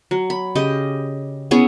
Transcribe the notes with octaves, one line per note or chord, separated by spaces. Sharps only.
F#3
B5
C#3 G4 D#5
B3 C#4 E4 G#4